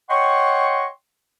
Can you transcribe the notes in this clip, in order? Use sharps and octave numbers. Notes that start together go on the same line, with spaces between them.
C#5 D#5 F#5 G5 C6 C#6